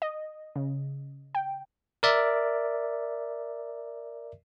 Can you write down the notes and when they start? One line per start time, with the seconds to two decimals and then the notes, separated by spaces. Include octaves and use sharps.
0.02 D#5
0.56 C#3
1.35 G5
2.03 A#4 D5 E5